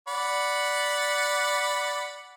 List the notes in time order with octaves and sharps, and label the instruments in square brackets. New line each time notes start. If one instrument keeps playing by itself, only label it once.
[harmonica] D5 F#5 B5